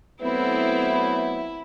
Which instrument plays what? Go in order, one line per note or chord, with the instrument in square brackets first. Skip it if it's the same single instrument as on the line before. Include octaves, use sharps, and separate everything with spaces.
[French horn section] F#3 A3 B3 [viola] C4 [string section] E4